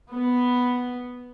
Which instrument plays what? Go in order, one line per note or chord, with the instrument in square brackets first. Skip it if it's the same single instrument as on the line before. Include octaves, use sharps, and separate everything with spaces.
[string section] B3